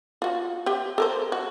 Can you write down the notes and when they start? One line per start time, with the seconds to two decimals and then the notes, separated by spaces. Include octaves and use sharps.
0.22 F4 F#4
0.66 G4 E5 G5
0.98 A4 A#4 C5
1.32 F#4